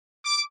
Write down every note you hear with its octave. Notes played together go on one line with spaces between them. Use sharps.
D6